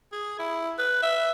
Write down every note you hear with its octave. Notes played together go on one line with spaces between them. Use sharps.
G#4
E4
B4
E5